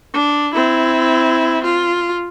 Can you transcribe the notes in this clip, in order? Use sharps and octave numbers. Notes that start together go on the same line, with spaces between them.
D4
C4 E4
F4